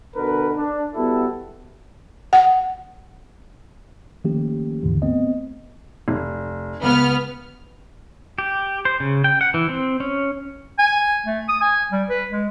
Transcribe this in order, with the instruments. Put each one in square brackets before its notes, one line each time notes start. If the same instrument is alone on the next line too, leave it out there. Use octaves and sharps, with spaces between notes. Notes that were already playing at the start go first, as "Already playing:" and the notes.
[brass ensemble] B2 D3 A#4 B4
D4
G3 B3 E4 F#4 A4
[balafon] F#5
[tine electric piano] D#3 F3 A3 A#3 C#4 G4
D#2 G#2 D3 E3
A3 B3 C4 D#5
[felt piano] F1
[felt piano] C#2 [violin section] B3 F6
[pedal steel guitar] G4
C5
C#3
G5
F#5
E3
C4
C#4
[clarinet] G#5
A3
D#6
G#5
G3
B4
G#3